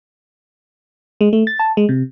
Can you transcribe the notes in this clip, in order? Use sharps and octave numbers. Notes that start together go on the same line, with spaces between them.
G#3
A3
A6
A5
G#3
C3